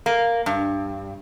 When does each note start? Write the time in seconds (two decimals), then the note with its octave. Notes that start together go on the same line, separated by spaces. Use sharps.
0.06 A#3
0.46 G2